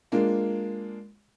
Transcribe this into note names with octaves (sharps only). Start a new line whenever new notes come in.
G#3 A#3 D4 F4